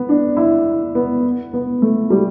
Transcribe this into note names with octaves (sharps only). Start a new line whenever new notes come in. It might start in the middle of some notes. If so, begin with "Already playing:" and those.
Already playing: B3
D4
E4
B3
B3
A3
G3